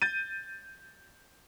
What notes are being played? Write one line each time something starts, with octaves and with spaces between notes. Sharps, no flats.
G6 A6 D#7